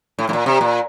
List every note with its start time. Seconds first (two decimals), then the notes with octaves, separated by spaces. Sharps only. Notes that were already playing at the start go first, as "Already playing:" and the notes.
0.19 A2
0.29 A2
0.33 A#2
0.46 C3
0.61 A#2